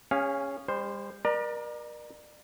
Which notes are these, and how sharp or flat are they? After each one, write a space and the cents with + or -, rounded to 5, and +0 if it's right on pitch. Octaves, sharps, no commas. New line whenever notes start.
C#4 +0 G#4 -30 F5 +0
G3 +40 C5 +0
A#4 +40 D5 +35 A#5 +0